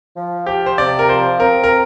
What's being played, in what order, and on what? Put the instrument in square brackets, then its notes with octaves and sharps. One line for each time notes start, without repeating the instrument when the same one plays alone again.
[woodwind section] F3
[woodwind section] F3 [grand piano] G4
[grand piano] C5
[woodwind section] C3 [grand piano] D5
[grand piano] A#4
[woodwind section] F3 [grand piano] C5
[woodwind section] C4 [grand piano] A#4
[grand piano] A#4